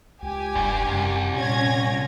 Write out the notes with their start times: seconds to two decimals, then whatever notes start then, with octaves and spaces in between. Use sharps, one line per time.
0.22 C#2 G4 G#5
0.55 F1 G2
0.87 C2 F#2
1.36 A#2 C#4 G#6 A#6